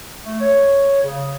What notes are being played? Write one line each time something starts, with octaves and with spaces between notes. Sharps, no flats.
A3
C#5
C#3